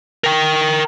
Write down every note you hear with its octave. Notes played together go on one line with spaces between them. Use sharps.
A#4 G5